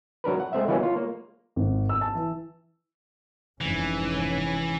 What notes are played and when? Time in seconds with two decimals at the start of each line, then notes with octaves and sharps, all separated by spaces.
0.24 F#3 D4 A#4 B4
0.40 F#5
0.53 G#3 A3 C4 E5
0.68 E3 F#3 G#3 A#3 B3 C#4
0.83 F4 C#5
0.96 A#3
1.56 G#1
1.89 E6
2.01 A5
2.15 E3
3.61 F1 G#2 E3 C#4